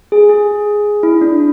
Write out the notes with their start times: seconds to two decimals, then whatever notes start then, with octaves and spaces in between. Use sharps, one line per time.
0.12 G#4
0.29 G#4
1.03 E4
1.21 D4